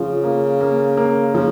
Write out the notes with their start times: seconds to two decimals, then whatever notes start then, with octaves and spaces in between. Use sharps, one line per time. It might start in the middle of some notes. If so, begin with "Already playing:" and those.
Already playing: C#3 F3
0.24 A#3
0.61 A#3
0.97 A#3
1.35 C#3 F3